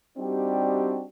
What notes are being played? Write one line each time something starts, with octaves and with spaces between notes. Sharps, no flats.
G3 C4 D4 D#4 F#4 G4